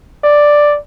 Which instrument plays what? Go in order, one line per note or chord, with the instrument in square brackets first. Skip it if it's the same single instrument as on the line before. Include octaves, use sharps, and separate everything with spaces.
[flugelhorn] D5